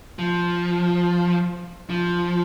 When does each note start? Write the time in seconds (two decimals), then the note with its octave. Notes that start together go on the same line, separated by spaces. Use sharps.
0.19 F3
1.90 F3